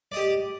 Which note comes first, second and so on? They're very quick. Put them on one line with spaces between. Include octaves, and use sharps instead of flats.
D5 D#5 G4